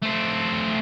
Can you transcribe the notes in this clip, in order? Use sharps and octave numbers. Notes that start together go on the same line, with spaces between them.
A3 C4